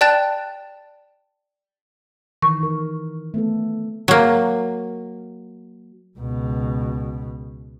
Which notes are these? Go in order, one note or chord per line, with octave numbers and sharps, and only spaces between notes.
D5 G5 A5 F#6 A6
D#3 E3 C#6
A#4
A3 B3 A4
F#3 A#3
C#2 B2